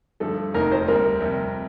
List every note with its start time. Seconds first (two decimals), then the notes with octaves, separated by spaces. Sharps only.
0.20 G2 D3 F3 A3 A4
0.54 F1 F2 D#3 A#3 D#4 A#4
0.71 C5
0.88 D2 C3 G3 C4 A#4
1.20 F2 C3 G3